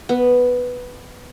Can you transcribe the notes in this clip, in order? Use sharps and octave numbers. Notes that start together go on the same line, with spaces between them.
B3